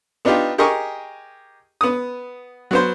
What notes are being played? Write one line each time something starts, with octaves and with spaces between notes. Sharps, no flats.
B3 D4 D#4 F4 G4
G4 G#4 A#4 D#5 C#6
B3 D#6
F#3 B3 C5